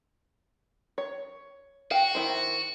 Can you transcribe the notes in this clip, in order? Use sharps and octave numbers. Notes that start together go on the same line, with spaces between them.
C#5
F#4 F5 G5
D#3 E4 C5